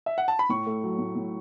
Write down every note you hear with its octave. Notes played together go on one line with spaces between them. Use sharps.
E5
F#5
A5
B5
A2 C#6
A3
F#3
A2
A2